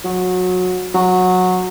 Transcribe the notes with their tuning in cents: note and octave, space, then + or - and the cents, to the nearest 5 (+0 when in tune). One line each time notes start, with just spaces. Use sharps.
F#3 -20
F#3 -15